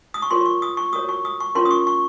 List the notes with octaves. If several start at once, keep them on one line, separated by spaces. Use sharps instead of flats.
D#6
C#6
F4 A#4 C#5 C6
C#6
D#6
C#6
F#4 A#4 C#5 D#6
C#6
D#6
C#6
C#4 F4 A#4 C#5 C6
D#6
C#6
C#6